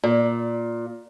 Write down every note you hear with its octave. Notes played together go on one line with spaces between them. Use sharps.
A#2